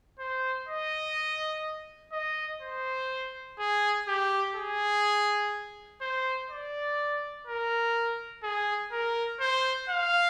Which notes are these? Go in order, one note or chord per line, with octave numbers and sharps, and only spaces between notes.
C5
D#5
D#5
C5
G#4
G4
G#4
C5
D5
A#4
G#4
A#4
C5
F5